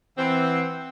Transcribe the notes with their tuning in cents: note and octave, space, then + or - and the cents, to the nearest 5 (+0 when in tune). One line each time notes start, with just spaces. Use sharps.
E3 +0 C4 +0 F#5 +0